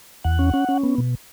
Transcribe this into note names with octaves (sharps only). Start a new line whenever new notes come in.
E2 F#5
C#4
C#4
C#4
B3
B2